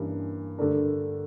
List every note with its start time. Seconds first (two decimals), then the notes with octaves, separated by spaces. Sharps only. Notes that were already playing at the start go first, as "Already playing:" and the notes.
Already playing: G2 E3 A#3 C#4
0.58 G2 D3 A3 D4 A#4